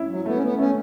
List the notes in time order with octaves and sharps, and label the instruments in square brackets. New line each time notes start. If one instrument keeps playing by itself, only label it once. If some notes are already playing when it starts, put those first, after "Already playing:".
Already playing: [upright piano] C#4 E4
[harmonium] F#3
[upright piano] A3 [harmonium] B3
[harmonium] C#4
B3
[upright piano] A3 [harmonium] C#4